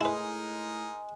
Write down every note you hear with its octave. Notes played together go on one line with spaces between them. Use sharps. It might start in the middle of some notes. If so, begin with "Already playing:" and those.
A2 G#3 D#4 E4 G#4 A#4 B4